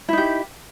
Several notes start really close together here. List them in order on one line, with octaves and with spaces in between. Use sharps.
E4 D#4 G4